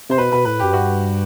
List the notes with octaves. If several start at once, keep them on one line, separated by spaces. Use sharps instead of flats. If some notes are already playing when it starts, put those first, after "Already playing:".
C3 C5
B2 B4
B2 B4
A2 B4
F#2 G4
G2 F#4